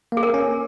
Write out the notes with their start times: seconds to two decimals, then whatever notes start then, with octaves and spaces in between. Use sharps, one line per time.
0.12 A#3 G#4
0.23 A#4
0.34 C#4